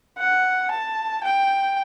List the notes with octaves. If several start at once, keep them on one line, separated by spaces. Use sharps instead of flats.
F#5
A5
G5